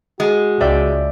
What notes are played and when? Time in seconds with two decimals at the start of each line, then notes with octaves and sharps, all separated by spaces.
0.20 G#3 F#4
0.61 C#2 D5 E5 G5